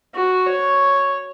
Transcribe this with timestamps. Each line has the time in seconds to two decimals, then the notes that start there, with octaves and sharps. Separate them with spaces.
0.15 F#4
0.47 C#5